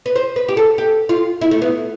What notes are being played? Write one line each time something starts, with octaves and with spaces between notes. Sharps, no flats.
B4
C5
B4
G4
A4
G4
F4
E4
A3
B3